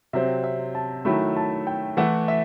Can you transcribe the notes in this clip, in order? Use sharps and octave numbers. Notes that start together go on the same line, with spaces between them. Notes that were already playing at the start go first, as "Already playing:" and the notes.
C3 F#3 C4 E5
E5
A5
D#3 F#3 A3 E4 B5
A5
G5
E3 A3 E4 F#5
E5